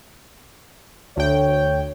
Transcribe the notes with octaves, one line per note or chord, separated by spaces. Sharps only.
D2 C#5 G5